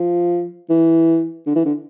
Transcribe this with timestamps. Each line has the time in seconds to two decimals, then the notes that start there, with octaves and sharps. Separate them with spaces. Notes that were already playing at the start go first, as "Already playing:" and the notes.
Already playing: F3
0.70 E3
1.46 D3
1.56 E3
1.66 D3